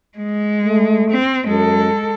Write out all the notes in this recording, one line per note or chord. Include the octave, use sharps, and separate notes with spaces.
G#3
A3
C4
F#2 G#3 A4